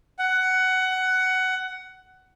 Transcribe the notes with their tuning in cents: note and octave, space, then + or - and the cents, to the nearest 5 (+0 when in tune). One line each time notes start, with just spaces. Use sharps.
F#5 +15